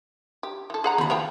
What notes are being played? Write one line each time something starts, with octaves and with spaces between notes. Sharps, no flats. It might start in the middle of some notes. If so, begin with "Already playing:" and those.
G4
E3 A4
G#4 F#5 A#5
D#2 F3 B5
F3 C5 F5 G5